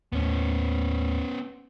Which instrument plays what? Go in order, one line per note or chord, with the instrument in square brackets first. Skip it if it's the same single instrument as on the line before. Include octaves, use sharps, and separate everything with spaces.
[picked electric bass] D#2 A2 [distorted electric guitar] B3 C#4